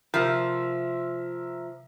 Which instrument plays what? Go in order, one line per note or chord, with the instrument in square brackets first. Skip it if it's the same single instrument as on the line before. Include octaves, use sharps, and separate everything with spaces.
[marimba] C3 G4 [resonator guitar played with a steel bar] F3 [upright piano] A#4 E5